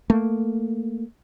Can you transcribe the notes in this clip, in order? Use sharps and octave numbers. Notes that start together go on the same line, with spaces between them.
A3 A#3